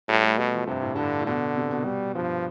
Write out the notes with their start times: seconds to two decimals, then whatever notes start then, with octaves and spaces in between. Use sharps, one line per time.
0.09 A2 G3
0.23 A3
0.38 B2 A3
0.54 F3
0.67 G2 C3
0.82 A2
0.96 G2 D3
1.20 A2
1.26 B2 D3
1.56 C3
1.71 B2
1.85 G3
2.15 G2 F3